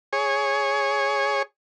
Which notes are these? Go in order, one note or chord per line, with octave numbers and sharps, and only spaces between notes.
G#4 C#5